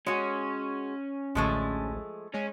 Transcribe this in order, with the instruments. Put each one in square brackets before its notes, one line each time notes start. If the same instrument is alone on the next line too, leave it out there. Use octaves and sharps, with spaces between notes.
[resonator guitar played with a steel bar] G#3 F#4 [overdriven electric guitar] C#4
[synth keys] A1 D2 [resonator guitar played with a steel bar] F3 G#3 A3
[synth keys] G#3 [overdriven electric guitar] C#4